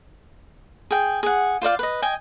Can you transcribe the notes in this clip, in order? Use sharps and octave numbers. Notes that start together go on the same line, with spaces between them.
G#4 G5
G#4 F#5
F4 C5 D5 F5
B4 D#5
D#5 G5 G#5